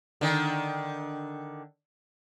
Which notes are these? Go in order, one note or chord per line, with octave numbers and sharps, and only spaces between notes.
D3 D#3